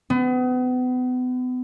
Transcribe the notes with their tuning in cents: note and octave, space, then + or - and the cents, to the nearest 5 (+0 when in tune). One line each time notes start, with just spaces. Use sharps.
B3 +35